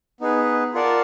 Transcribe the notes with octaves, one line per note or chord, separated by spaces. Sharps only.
B3 D#4 G#4 B4
F4 A#4 D5 F#5 A5